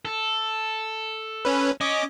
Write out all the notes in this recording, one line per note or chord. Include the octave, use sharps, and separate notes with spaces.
A4
C#4 B4
C#4 D#5 D6